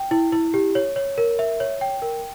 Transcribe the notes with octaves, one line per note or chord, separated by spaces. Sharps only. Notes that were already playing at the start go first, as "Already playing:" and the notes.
Already playing: G5
E4
E4
G4
C#5
C#5
A#4
E5
C#5
G5
A#4